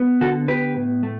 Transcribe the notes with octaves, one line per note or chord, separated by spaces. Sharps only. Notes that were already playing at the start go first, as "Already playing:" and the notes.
Already playing: B3
D3 F#4 A4
B3 G4 B4
A2
A3